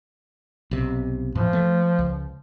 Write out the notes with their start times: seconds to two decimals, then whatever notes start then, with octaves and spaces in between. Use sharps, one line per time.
0.71 B1 C3
1.35 E2 A2 E3 F3
1.53 A3
1.99 C#2